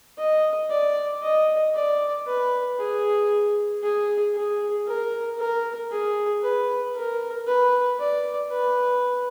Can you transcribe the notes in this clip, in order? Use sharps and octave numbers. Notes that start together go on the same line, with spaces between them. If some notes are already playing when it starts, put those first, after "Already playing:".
D#5
D5
D#5
D5
B4
G#4
G#4
G#4
A#4
A#4
G#4
B4
A#4
B4
D5
B4